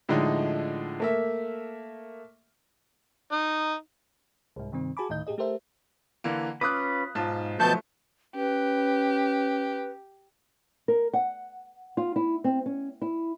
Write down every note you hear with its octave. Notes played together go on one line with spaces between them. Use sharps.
A2 D3 F3 G#3 D#4
A3 A#3 E5
D#4
C2 G#2
G2 C3 D#3 C4
F#4 G#4 G#5 A5 B5 D6
D2 A2 D#3 D#5 G6
A2 G4 G#4 D#5
A3 G4 A4 A#4 C5 E5
D3 E3 A#3
C#4 F4 B4 D6 D#6 F#6
B1 G#2 F4 A5
B2 D3 F3 F#3 A3 A5 G6
C#4 G4 B4
A#4
F#5
F4
E4
C4
C#4
E4